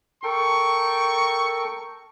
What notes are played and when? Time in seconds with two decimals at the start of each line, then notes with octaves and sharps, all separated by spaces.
0.24 A4 A#4 G5 C#6